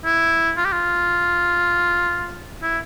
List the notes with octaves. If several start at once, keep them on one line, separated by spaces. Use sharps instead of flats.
E4
F4
G4
F4
E4